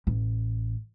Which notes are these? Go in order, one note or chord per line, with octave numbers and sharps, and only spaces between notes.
A1